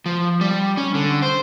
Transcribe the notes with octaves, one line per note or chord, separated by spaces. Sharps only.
F3
G3
C#4
D3
C5